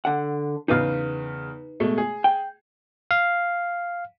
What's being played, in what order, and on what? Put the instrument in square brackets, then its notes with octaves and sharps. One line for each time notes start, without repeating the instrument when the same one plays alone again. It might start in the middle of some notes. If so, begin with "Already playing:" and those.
[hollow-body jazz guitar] D3 F#5
[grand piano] E2 C#3 [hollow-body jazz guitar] D#4 B4 F5
[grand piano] B2 G#3 A3
G#4
[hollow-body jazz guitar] G5
[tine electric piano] F5